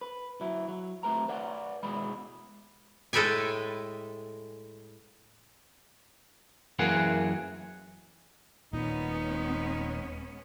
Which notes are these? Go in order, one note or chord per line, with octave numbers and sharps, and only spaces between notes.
B4
F#3 E4
F#3
F2 F3 A3 G4 B4 A#5
B4 C#5 D5 F#5
G#2 B2 G#3 D#5 B5
A2 G#3 A4 B4 G5 G#5
F#2 E3 A#3 G#4 F#5
D#1 A#2 G#3 B3 C#4 D#4